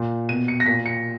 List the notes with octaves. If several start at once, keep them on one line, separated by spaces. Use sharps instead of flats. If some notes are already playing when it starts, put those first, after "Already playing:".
Already playing: A#2
B2 D#7
C#7
A#6
A#2 B6
C#7